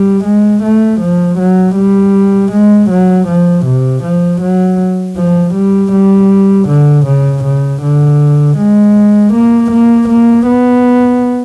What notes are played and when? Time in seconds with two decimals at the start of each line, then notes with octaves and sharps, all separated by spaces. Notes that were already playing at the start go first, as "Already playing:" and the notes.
Already playing: G3
0.24 G#3
0.63 A3
1.01 F3
1.38 F#3
1.76 G3
2.52 G#3
2.90 F#3
3.28 F3
3.66 C3
4.03 F3
4.41 F#3
5.17 F3
5.55 G3
5.92 G3
6.68 D3
7.06 C#3
7.44 C#3
7.82 D3
8.57 G#3
9.34 A#3
9.71 A#3
10.09 A#3
10.47 B3